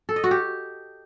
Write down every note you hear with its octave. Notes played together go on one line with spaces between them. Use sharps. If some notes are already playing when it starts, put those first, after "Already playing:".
A4
D#5
F#4
G4